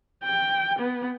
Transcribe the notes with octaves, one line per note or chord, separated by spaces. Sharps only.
G5
B3